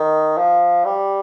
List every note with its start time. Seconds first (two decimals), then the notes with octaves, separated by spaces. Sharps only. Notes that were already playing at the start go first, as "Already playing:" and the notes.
Already playing: D#3
0.37 F3
0.85 G3